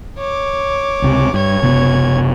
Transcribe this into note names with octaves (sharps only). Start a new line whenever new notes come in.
C#5 D6
C#2 C3
G2 C#5 G#6
F#1 C3 B3